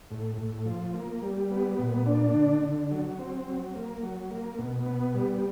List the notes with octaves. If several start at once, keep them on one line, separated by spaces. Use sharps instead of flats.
A2
A2
F3
A#3
G3
B3
A#2
D4
D3
D3
F#3
C4
F#3
A#3
F#3
A#3
B2
B3
G3